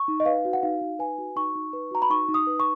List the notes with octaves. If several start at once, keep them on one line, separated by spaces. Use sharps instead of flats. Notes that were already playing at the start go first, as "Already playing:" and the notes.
Already playing: C#6
D#4
D#5
B4 F5
F#4
F#5
D#4 F5
D#4
B4 G#5
F#4
D#4 C#6
D#4
B4
F#4 A#5
B5
D#4 C#6
D#4
D#6
B4
C#6